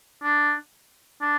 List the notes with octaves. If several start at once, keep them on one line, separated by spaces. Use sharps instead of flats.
D4
D4